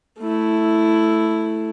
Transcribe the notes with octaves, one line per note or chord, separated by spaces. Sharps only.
A3 E4